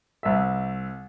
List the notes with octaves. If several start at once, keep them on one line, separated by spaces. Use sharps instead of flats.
C2 E5